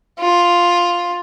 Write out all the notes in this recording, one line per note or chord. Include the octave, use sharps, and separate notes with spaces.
F4